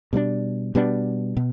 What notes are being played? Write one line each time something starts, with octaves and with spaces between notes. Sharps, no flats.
B2 G3 B3 D4
B2 G3 B3 D4
B2